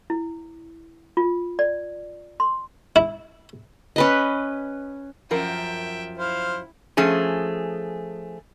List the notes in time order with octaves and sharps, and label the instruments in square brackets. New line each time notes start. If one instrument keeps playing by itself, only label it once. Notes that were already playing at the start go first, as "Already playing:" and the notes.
[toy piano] E4
F4
D5
C6
[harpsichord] E4
[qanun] C#4 B4 D#5
[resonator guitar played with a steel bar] F#2 F3 A#4 [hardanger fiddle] E5 G5
[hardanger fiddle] E4 [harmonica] C5 F5
[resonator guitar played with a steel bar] F3 A3 C#4 G#4